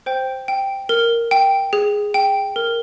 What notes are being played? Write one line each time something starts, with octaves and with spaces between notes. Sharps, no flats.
C5 G5
G5
A#4
G5
G#4
G5
A#4